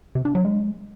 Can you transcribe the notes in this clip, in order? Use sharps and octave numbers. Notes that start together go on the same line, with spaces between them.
C3
D4
F#3
G#3